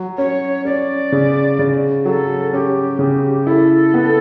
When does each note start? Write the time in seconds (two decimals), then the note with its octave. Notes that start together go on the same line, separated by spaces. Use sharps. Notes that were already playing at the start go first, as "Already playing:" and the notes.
Already playing: F#3
0.18 C#4 C#5
0.65 C#4 D5
1.12 C#3
1.59 C#3
2.05 F#3 A4
2.53 C#4 G4
2.99 C#3
3.46 E4 A4
3.94 B3